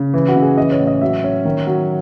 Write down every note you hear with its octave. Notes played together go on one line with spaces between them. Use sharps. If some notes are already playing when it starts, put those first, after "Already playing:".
Already playing: C#3
E3
F#4
C#3
G#4
E3 D#5
C#5
A2
D#5
F#3 E5
C#4
D#3
F#3